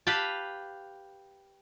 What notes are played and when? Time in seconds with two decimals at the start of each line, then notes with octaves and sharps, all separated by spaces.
0.07 G4 B4 F5 G5 A5